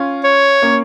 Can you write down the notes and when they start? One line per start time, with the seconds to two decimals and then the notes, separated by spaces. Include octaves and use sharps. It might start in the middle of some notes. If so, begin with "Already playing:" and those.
Already playing: C#4 F4
0.24 C#5
0.62 A#3 C#4